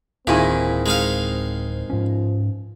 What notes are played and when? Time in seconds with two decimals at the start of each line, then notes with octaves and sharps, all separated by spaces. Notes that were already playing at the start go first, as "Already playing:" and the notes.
0.27 D1 A#2 D#3 C4 E4 G#4
0.86 G#3 D#4 F5
1.90 G#2 F3 C#4